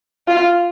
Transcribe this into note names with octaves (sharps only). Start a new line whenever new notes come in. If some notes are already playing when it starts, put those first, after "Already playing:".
F4